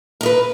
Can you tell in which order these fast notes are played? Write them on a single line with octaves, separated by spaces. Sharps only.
A#4 D#5 B4